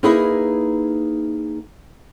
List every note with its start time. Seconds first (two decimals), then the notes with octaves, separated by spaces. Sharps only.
0.03 A#3 D#4 E4 G#4 B4 E5